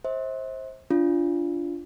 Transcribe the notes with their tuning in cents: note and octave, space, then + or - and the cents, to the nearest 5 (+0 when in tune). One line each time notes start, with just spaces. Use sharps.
C5 +20 E5 -40
D4 -15 F4 -15